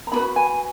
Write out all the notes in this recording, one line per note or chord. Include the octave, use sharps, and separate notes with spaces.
A#5
C#4 F#4 B4 B5
G#5